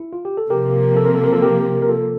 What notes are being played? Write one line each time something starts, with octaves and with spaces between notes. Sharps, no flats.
E4
F4
G4
A4
C3 F3 A#3 G4 A#4
A4
A#4
A4
A#4
F4 A4
G4 A#4
A#4
F4 A4